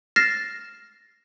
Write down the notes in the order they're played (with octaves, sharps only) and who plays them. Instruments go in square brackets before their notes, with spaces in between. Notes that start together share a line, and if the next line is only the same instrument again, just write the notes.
[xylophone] F6 A6 A#6 C7 E7